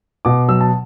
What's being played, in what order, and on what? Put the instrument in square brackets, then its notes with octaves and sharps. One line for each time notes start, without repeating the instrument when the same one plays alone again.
[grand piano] B2 D6
F#3 E6
A5